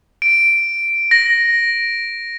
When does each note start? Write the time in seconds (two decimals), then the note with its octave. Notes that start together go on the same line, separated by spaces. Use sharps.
0.22 D7
1.11 A#6